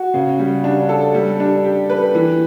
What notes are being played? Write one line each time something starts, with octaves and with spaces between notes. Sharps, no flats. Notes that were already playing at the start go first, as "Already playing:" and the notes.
Already playing: F#4
C#3
G3
D4
A4
G3
D4
G4
B4
E3